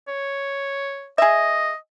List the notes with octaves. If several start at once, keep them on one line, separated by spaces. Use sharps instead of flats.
C#5
G#4 D#5 E5